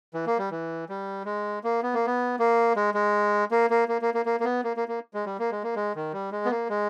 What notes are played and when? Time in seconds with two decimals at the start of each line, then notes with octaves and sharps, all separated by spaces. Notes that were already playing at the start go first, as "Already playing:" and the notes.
0.14 E3
0.26 A#3
0.38 G3
0.51 E3
0.89 G3
1.25 G#3
1.64 A#3
1.83 B3
1.94 A#3
2.07 B3
2.39 A#3
2.76 G#3
2.94 G#3
3.51 A#3
3.70 A#3
3.88 A#3
4.01 A#3
4.14 A#3
4.25 A#3
4.40 A#3
4.44 B3
4.64 A#3
4.77 A#3
4.88 A#3
5.14 G#3
5.26 G3
5.39 A#3
5.52 G#3
5.63 A#3
5.76 G#3
5.95 D#3
6.13 G3
6.32 G#3
6.45 B3
6.51 A#3
6.70 G#3